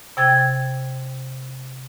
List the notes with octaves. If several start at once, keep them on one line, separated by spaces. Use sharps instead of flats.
C3 G5 G#6 A6